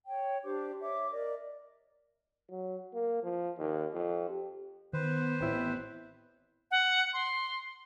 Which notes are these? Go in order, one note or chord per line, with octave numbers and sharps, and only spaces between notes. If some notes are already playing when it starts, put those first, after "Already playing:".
C#5 G5
D4 G4 C5 D6
C#5 E5 D6
A#4 D5 D#5
F#3
A#3
F3
D#2
F2
G4
D#3 B3 B4 C5
A1 C4 E4
F#5
C6